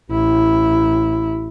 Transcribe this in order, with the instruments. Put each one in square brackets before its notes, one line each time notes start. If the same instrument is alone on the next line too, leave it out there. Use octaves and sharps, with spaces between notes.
[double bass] A1 E4